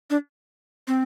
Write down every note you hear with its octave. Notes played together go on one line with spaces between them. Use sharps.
D4
C4